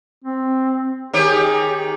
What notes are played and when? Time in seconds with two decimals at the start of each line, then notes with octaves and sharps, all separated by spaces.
0.24 C4
1.13 D#3 G4 G#4 C#5